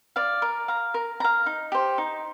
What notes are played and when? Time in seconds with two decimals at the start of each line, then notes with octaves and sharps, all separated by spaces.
0.16 D5 F5
0.42 A#4
0.68 F5 A#5
0.94 A#4
1.20 F5 A#5
1.46 D#4
1.72 G4 C5
1.98 D#4